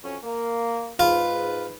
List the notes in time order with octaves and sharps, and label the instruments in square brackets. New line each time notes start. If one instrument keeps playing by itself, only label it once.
[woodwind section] F2 F#3 C#4
A#3
[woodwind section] G#2 B4 [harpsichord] F4